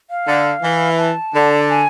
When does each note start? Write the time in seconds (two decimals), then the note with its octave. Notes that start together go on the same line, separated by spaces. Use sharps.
0.10 F5
0.27 D3
0.62 E3
0.97 A5
1.34 D3
1.69 G#5